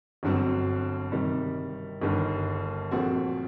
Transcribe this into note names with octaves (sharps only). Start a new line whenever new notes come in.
G1 G2 F#3 C4
C3 D#3 G3
G1 G2 D#3 G3
A#1 A#2 A3 C4 F#4